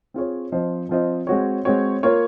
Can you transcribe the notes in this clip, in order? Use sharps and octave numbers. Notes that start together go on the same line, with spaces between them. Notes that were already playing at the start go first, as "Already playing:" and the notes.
C4 F4 G#4 C#5
F3 C4 F4 C5 D#5
F3 C4 F4 C5 D#5
G#3 C4 F#4 C#5
G#3 C4 F#4 C#5
A#3 F4 A#4 C#5